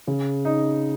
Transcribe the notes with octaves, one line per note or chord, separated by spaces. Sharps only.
C#3
D#4